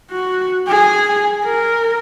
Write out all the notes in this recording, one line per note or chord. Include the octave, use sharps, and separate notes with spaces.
F#4
G#4
A#4